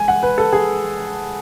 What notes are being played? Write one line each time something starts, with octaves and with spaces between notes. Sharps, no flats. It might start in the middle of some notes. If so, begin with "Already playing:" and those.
Already playing: G#3 G#5
F#5
B4
A4
G#4